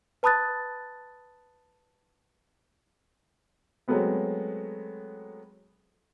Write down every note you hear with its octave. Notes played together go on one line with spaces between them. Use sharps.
B4 A5 B5 D#6 F#6 A6
F#3 G#3 A3 B3 C4